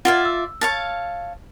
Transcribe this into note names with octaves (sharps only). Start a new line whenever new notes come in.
F4 D5 E5 F#5 F6 G#6
E6
C#5 F5 A5